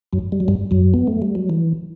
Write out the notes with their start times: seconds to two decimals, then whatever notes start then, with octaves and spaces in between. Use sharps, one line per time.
0.13 F#2 F#3
0.32 G3
0.40 F#3
0.48 G2 G3
0.71 F#2 F#3
0.94 B3
1.07 A3
1.22 G3
1.35 F#3
1.50 E3